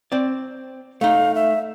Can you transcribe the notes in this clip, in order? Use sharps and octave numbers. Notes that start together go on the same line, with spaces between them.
C4 D5
A3 D#4 F5
E5